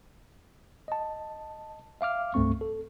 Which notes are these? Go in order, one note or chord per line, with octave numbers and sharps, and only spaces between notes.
D#5 A5
E5 F5 D6 F6
C2 G2 A3 C4 C#6
A4